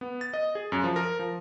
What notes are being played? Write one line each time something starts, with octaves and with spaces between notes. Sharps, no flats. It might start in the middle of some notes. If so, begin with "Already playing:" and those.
B3
A6
D#5
G#4
F#2
F3
A#4
F3